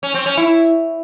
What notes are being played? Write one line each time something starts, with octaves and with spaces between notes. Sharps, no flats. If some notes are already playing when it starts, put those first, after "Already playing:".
C#4
C4
C#4
E4